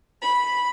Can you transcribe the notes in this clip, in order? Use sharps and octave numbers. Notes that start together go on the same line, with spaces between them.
B5